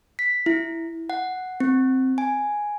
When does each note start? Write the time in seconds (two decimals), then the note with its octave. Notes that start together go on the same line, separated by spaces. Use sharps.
0.19 B6
0.46 E4
1.10 F#5
1.60 C4
2.18 G#5